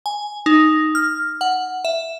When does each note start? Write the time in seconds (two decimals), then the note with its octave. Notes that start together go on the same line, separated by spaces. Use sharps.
0.06 G#5
0.46 D#4
0.95 F6
1.41 F#5
1.85 E5